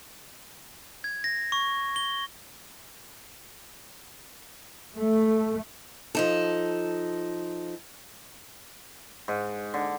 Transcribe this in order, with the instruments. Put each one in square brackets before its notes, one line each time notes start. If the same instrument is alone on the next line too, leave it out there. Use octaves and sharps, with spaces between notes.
[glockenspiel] G#6
A#6
C#6
G7
[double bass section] A3
[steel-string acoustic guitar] F3 D#4 A4
[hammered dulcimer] G#2
D3